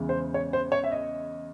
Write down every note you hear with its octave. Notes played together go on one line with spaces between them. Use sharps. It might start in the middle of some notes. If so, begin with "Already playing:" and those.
Already playing: E2 C#3 E3 G#3
C5
C#5
C5
C#5
E5
D#5